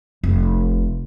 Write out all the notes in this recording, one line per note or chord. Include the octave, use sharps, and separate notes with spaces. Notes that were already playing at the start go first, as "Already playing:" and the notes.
F1